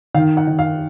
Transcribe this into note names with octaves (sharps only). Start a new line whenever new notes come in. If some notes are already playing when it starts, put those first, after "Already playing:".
D#3 F5
F#5
D#3
F5